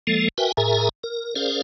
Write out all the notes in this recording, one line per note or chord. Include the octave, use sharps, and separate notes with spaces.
F3 G#3 A#3 A4
F#4 A#4 B4 E5 G5 G#5
A2 G#4 A#4 E5 G#5 A#5
A#4
C#4 G#4 A#4 C5 D5 F5